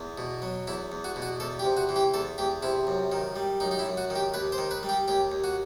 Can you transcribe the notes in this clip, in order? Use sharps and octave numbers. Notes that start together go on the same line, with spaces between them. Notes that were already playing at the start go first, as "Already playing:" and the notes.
Already playing: E2
B2
F#3
E2 E4
E2
F#4
B2
F#4
E2 A4
G4
C3
F#4
E3
G4
E2 A4
E2 G4
C3 E4
F#2
D#3
G3
F#2 D#4
D#4
E4
F#2
F#4
D#3
G4
D#2 B4
C5
D#3
B4
G3
G4
D#2 G4
D#2
F#4